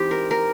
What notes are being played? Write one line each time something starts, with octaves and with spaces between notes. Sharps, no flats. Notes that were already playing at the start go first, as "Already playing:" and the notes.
Already playing: E3 G#3 C4 D#4 G4
A#4
A#4